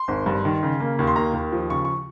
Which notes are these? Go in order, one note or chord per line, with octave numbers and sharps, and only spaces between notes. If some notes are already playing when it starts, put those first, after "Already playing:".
Already playing: C6
G#1
G2
D#3
C#3
A#3
D#2
C6
A#3 A#5
D#2
F3
C#3 C#6
C#6